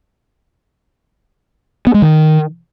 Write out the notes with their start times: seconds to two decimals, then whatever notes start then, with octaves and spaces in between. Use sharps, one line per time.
1.87 B3
1.94 G#3
2.02 D#3